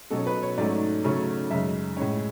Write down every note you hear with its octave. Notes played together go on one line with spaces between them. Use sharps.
B2 F#3 C#4 A4
B4
C#5
G#2 F#3 A3 C#4 D5
C#3 F#3 A3 C#4
F#2 C#3 G#3 E5
A2 G#3 C#4